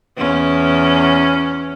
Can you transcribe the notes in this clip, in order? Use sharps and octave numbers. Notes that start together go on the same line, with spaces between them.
E2 C#4